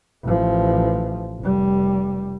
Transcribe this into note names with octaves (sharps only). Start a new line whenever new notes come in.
A1 F3
F1 G3